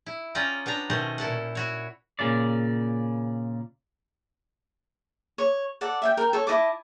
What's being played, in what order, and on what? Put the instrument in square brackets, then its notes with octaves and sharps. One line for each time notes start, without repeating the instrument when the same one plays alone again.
[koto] E4
C#4 F4 D5 D#5 G5 A#5
B3 D4 G5 A#5
B2 D#3 A3 C#4 C5 D#5
A#2 E4 A4 F#5
E4 F#4 C#5
[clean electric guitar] A#2 C#3 D5
[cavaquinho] C#5
A4 D5 F#5
E5 F5 G5
A#4 G5
A4 C#5
E4 D#5 A5 D6